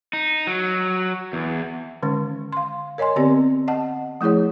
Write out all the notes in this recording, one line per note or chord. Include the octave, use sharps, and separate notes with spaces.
D#4
F#3
E2
D3 D#3 G#3 C#4
F5 C6
A#4 C#5 D#5 G#5 C6
D3 B3 C4 G4 D5
D#5 F#5 A5
F3 A3 E4 G#4 C#5